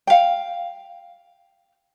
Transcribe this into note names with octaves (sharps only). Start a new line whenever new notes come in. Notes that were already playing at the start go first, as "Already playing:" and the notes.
F5 G5